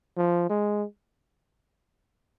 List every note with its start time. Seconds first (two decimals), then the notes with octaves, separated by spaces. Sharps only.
0.17 F3
0.49 G#3